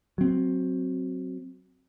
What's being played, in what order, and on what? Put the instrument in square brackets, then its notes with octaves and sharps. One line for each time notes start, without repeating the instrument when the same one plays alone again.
[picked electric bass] F#3 C4